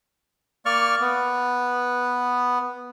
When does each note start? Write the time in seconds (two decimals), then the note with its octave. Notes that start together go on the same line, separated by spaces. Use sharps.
0.66 A#3 D5 C#6 F6
1.01 B3